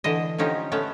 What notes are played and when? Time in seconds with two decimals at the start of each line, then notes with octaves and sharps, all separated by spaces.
0.04 D3 E3 D#5
0.38 D3 F3 C#4 D#4 G4
0.72 A3 B3 C#4